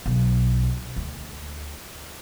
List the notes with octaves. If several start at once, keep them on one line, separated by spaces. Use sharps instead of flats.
B1
D2